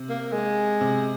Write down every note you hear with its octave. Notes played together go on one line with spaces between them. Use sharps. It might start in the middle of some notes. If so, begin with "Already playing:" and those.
Already playing: C3
A#3
G#3
C3